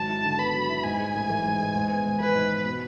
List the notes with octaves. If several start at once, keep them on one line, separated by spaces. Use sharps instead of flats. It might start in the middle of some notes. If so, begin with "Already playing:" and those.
Already playing: G#1 F#3 A5
E4
D3
B3 B5
F#3
E4
G#2 G#5
G#3
A1
E3
G#2
G#3
G#2
B3
G#1
E3 B4
G#2
B3
B2